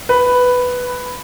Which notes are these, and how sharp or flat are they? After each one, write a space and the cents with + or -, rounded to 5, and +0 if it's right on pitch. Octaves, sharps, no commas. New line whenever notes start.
B4 +5